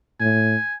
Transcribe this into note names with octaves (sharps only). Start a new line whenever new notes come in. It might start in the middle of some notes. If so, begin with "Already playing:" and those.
A2 G#5